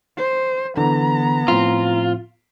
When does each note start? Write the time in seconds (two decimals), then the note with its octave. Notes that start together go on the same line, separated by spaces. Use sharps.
0.17 C5
0.77 D3 E3 B3 A#5
1.48 A2 F3 C4 F4